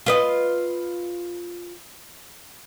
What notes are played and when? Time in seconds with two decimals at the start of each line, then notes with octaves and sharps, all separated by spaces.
0.06 F4 B4 D#5